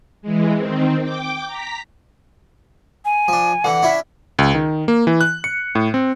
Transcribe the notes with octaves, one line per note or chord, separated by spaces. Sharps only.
E3 G#3
D#3 C4
G5 D6
A#5 B6
G#5
F3 D4
D3 E3 F#5
C#4 D4 E4 E5
C#2
D#3
A#3
E3
F#6
C#7
A2
C4